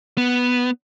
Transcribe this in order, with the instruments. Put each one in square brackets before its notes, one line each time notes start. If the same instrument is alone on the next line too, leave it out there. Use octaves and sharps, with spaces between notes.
[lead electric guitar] B3